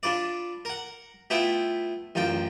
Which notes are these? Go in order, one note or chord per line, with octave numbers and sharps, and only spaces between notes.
D4 F4 B4 D5
A#4 F#5
A3 B3 E4 F4 G5
A1 F#2 F4 G5